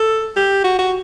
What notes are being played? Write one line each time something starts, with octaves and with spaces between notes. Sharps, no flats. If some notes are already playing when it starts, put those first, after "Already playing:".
Already playing: A4
G4
F#4
F#4